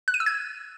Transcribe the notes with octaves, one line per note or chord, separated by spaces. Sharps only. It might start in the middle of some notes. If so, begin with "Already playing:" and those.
F#6
D#7
E6
G#6